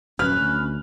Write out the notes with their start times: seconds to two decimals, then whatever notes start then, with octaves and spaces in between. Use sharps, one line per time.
0.19 D#1 F#2 C#4 B4 F6
0.40 D2